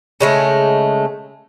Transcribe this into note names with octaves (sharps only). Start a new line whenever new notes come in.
C#3 G#3 A3